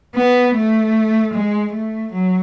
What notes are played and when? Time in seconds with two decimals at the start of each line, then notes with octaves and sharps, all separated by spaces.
0.15 B3
0.54 A3
1.33 G#3
1.73 A3
2.12 F#3